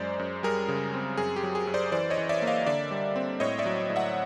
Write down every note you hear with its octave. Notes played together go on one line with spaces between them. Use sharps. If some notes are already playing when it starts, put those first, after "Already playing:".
Already playing: F#2 G#3 C5 D5
F#2
G3 G#4 A#4
C#3
C4
F#2 G#4
G4
F#3
G#4
F#2
C5 D5
E3 C5 D5
C#5 D#5
E3
D5 E5
A#3
D#5 F5
D3 D5 E5
G3
C4
A2 C#5 D#5
D5 E5
F#3
A2
E5 F#5